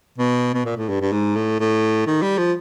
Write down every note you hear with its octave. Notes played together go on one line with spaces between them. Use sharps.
B2
B2
A#2
A2
G2
G2
G#2
A2
A2
D#3
G3
F3